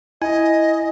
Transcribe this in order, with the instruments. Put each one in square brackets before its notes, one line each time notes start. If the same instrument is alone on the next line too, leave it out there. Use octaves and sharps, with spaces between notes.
[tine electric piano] E4 G#5 [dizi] D#5